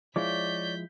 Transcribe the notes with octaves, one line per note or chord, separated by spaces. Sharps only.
F3 G#3 E4 C#5 D5 D6 G6 B6